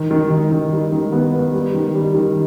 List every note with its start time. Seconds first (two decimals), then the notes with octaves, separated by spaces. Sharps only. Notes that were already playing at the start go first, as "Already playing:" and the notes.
Already playing: D#3
0.11 D#3
0.30 D#3
0.51 D#3
0.72 G3
0.92 D#3
1.12 B3
1.33 B3
1.53 G3
1.74 D#3
1.95 G3
2.15 D#3